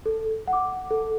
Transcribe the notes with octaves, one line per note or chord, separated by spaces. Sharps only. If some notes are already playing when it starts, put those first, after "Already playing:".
A4
F#5
D6
A4